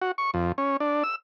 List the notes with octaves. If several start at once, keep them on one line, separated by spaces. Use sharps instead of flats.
F#4
C#6
F2
C#4
D4
E6